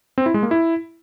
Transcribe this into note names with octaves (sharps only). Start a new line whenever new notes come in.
C4
E4
G#3
A#3
E4